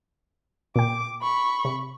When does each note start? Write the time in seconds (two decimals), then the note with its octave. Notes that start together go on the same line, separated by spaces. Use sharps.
0.76 A#2 G5 D6
1.22 B5 C#6
1.65 C3